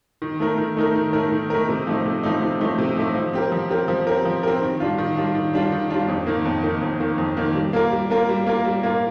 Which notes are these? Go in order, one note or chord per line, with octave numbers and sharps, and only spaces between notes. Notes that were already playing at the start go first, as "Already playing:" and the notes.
D#3
A3 D#4 A#4
D#3
A3 D#4 A#4
D#3
A3 D#4 A#4
D#3
A3 D#4 A#4
C3
F3 A3 D#4
C3
F3 A3 D#4
C3
F3 A3 D#4
C3
F3 A3 D#4
F3
C4 G4 A#4
F3
C4 G4 A#4
F3
C4 G4 A#4
F3
C4 G4 A#4
D#3
G3 D4 F4
D#3
G3 D4 F4
D#3
G3 D4 F4
D#3
G3 D4 F4
F2
D#3 A#3
F2
D#3 A#3
F2
D#3 A#3
F2
D#3 A#3
G3
A#3 F4 A#4
G3
A#3 F4 A#4
G3
A#3 F4 A#4
G3
A#3 F4 A#4